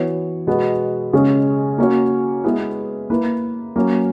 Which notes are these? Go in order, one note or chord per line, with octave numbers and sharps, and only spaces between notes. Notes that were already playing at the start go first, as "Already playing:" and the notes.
Already playing: E3 B3 F#4 C#5
B2 G#3 B3 F#4 B4
C#3 G#3 C#4 G#4
A#3 C#4 F#4 C#5
G#3 B3 E4 G#4 B4
A#3 E4 B4
F#3 A#3 C#4